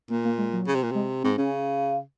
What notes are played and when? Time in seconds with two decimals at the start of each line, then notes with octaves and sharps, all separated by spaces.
0.10 A#2 A#3
0.25 A#3
0.38 G#3
0.53 F#3
0.67 C#3
0.75 C3
0.83 A#2
0.91 C3 G#3
1.23 G#2 C4
1.38 C#3 C#4